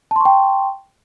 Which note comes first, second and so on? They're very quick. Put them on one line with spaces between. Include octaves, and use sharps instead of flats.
A5 C6 C#6 G5